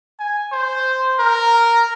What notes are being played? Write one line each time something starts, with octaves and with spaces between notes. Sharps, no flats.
G#5
C5
A#4